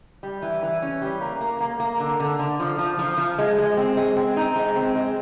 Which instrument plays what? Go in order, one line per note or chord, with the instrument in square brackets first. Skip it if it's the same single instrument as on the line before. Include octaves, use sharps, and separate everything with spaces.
[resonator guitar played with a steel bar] G3
E3
E3
C#4
G3
A#3
A#3
A#3
A#3
D3
D3
D3
F3
F3
F3
F3
G#3
G#3
C4
G#3
C4
D#4
G#3
C4
G#3